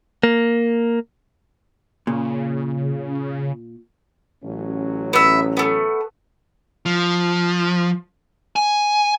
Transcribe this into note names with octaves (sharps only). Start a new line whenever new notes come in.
A#3
A#2 C#3
A1 F#3 C#4
B3 E5
A3 B3
F3
G#5